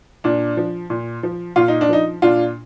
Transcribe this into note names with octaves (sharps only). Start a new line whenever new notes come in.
A#2 D4
F3
A#2
F3
A#2 F4
D#4
D4
F3 D#4
A#2 D4 F4